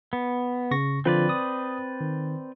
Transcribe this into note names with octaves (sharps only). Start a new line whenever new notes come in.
B3
C#3 C#6 A#6
D3 F3 C4 F4 B4 D5
D#6
D#3